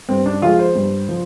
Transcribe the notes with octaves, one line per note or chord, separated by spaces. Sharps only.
G2 C4
D4
F3 G#3 F4
C5
G2
F3